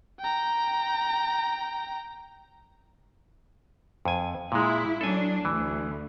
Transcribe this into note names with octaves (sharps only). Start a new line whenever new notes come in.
G5 A#5
F2 G#5
A#2 G#3 E4
F#3 D4 A4 G#5
D2 E3